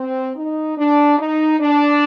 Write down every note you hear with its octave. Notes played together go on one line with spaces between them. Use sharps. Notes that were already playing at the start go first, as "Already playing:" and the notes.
Already playing: C4
D#4
D4
D#4
D4